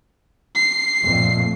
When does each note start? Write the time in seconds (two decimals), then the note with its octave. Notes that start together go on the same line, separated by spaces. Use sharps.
0.55 C7
1.04 F2 A#2 A3